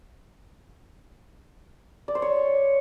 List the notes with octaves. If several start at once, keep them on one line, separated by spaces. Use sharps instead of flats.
D5
C5
C#5